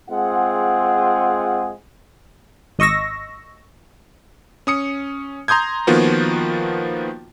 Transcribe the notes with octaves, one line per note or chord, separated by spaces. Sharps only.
G#3 C4 F4 G#4 F#5
G#1 D#5 C#6 E6 A#6
C#4 D#6 C#7
A#5 C6 D#6 G6 G#6
D#3 F3 A#3 B3 F4 F#4